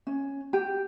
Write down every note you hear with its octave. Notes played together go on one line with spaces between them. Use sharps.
C#4
G4